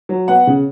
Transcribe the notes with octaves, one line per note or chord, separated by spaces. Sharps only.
F#3
B3 F#5
C#3